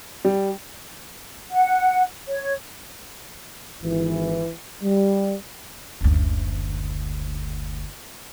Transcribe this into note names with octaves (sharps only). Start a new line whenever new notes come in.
G3
F#5
C#5
G#1 E3
G3
F#1 D2